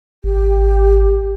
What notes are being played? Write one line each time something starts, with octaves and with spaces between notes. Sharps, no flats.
G#1 G4